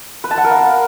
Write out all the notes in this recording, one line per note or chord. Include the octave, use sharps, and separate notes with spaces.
B4
A5
F#5
A#4
F5